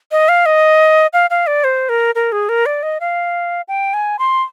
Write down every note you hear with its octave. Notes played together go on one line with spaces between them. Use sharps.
D#5
F5
D#5
F5
F5
D5
C5
A#4
A#4
G#4
A#4
D5
D#5
F5
G5
G#5
C6